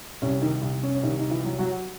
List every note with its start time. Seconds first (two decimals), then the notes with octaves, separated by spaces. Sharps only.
0.22 C2 C#4
0.41 D#3 D#4
0.62 C2
0.83 C#4
0.95 C#4
1.03 C2 D#3 D#4
1.20 D#4
1.31 E3 E4
1.44 F#3
1.59 F#3 F#4